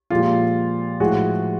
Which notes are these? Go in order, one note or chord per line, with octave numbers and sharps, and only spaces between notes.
A#2 F3 G#3 F4 G4
A2 F3 G#3 F#4 G#4